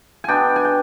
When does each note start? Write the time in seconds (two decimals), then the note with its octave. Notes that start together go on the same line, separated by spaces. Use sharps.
0.24 B2 B3 D4 G5 G#5
0.56 G#5
0.65 G5